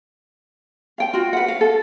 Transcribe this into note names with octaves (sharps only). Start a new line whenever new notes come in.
F5 G5
F4 F#4
B4 F#5
F5
A4